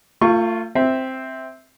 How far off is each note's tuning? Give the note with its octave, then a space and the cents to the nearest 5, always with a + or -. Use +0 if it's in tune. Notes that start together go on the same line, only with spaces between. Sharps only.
A3 +40 F4 +0 C#6 +0
C4 +0 E5 -10